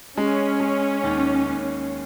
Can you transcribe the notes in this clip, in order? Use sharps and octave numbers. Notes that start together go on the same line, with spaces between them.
G#3 C#4
G#3
D#2
D#2